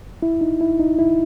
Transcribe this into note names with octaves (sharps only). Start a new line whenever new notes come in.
E4
D#4
E4
D#4
E4